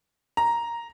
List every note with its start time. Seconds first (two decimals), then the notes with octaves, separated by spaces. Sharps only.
0.37 A#5